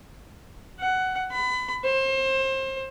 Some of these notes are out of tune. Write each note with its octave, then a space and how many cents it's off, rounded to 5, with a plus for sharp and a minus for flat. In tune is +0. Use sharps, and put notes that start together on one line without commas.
F#5 +15
B5 +30
C5 +30